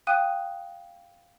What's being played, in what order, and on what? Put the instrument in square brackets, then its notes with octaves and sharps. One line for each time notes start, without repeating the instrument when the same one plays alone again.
[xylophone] F5 G5 D#6 F#6 D#7